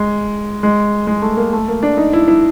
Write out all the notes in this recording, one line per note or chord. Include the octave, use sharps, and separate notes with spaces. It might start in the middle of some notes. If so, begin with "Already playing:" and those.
Already playing: G#3
G#3
G#3
A3
A#3
A3
A#3
D4
D#4
E4
E4